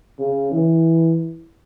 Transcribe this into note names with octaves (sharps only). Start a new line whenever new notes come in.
C#3
E3